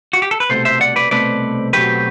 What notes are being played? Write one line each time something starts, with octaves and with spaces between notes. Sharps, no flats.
F#4
G4
A4
B4
C2 B2 A3 C4 A4 C5
C5 E5
D5 F#5
B4 D5
C2 B2 A3 C4 B4 D5
B2 F#3 A3 C4 G4 B4